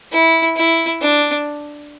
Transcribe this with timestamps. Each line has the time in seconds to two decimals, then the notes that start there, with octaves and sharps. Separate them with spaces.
0.12 E4
0.56 E4
1.02 D4